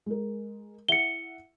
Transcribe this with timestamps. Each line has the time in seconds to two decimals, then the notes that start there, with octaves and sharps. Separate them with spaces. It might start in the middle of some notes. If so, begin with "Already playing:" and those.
0.06 G#3 A#4
0.89 E4 E5 F#5 C#7 G7